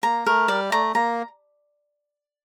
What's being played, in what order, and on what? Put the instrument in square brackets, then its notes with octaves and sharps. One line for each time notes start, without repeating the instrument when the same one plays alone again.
[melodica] A#3 [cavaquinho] A#5
[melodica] A3 [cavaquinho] A#4
[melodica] G3 [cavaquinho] D5
[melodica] A3 [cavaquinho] A#5
[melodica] A#3 [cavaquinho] A#5